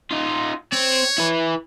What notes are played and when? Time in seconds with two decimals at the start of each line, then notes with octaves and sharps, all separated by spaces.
0.11 D#4 F4
0.72 C4 C#5
1.18 E4 B4